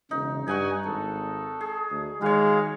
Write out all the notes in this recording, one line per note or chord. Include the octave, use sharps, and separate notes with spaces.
E1 C#3 D#4
G2 D#4 F#5 G#5 C#6
G#1 A4
G#4
D2
D#3 G#3 F#4 G#4 C#5 F5